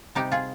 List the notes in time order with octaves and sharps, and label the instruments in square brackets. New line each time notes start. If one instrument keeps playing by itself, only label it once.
[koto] C3 G3 D#4 G4
F4 G#4